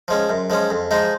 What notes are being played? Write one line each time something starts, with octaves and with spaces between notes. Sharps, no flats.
F3 G#3 C#4
F#2
F3 G#3 C#4
F2
F3 G#3 D#4